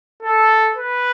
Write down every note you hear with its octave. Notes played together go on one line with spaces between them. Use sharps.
A4
B4